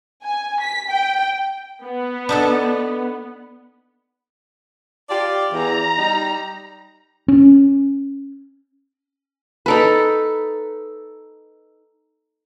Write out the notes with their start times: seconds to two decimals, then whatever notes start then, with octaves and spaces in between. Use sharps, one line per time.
0.23 G#5
0.61 B6
0.90 G5
1.82 B3
2.29 D4 D#4 A4
5.10 F4 G4 D5
5.52 E2 A#5
5.98 G3 D#4
7.28 C#4
9.66 D#4 A4 B4